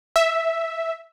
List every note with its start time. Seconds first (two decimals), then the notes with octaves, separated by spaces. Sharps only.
0.16 E5